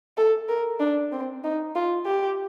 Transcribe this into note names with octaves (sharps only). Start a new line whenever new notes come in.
A4
A#4
D4
C4
D#4
F4
G4